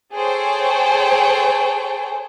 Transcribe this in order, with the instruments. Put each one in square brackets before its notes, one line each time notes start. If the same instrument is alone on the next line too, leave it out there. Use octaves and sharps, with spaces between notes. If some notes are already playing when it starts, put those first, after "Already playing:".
[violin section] G#4 A4 C5 C#5 G5